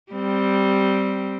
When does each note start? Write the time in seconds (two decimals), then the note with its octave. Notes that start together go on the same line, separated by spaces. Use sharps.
0.12 G3 C4